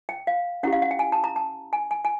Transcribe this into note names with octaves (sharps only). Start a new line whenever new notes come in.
G5
F5
C#4 E4 G4 F#5
F5
F#5
G5
G#5
A5
A#5
A5
G#5
G#5
G#5